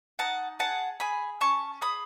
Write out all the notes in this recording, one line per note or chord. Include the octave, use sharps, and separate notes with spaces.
D#4 F#5 A5
G#4 F#5 A5
G#4 G#5 B5
C#4 A5 C#6
G#4 B5 D#6